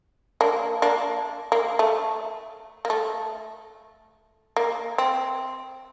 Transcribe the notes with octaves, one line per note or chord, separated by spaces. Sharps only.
A#3 D4
A#3 D4
A#3
A3
A#3
A3
A#3
C4